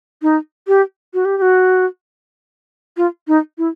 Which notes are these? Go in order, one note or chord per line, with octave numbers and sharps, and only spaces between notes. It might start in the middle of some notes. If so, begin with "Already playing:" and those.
D#4
G4
F#4
G4
G4
F#4
F4
D#4
E4